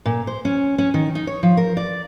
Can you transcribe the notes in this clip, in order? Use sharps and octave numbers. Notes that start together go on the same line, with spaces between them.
A#2
C5
C#4
C#4
D#3
D#4
C#5
F3
A#4
D5